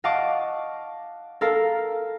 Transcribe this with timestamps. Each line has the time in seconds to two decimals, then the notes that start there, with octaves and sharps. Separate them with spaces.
0.04 D#5 F5 F#5 A5 C#6 D6
1.41 A4 A#4 F5